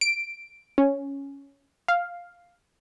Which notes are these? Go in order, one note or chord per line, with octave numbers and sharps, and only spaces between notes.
D7
C#4
F5